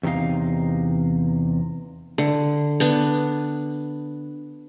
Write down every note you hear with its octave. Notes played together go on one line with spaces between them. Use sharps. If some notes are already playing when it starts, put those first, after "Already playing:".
E2 C3 F3 D#4 F5
D3
B3 D4